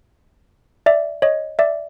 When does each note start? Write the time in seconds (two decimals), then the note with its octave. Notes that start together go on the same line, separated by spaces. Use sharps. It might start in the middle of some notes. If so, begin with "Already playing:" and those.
0.86 D5 E5
1.22 C#5 D#5
1.59 D5 E5